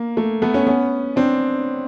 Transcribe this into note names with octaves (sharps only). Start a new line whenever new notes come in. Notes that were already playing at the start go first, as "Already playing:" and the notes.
Already playing: A#3
A3
A3 B3
B3 C#4
B3 C#4
C4 D4